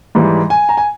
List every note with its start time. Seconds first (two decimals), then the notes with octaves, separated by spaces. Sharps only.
0.15 G#2 E3 G3
0.50 G#5
0.69 A#5
0.77 G#5